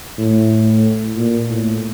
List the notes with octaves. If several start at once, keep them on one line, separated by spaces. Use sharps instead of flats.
A2
A#2
A2